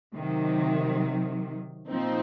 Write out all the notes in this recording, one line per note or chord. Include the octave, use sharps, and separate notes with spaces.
C3 D#3 F#3
A#2 F3 C4 D#4